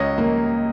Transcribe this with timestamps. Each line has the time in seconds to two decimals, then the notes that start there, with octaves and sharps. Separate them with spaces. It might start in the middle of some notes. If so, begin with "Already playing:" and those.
Already playing: C#2 C#5 D#5
0.18 A#3